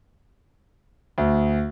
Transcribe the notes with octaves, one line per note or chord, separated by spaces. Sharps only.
D2